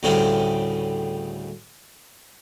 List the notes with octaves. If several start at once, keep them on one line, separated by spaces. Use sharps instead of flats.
D2 A2 C#3 G3 C4 F4